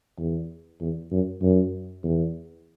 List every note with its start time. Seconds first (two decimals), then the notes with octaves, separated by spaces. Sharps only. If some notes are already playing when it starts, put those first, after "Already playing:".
0.18 E2
0.81 E2
1.11 F#2
1.42 F#2
2.04 E2